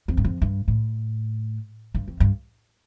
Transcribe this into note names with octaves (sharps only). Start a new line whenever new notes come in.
F2
G2
F2
G2
A2
G2
F2
G2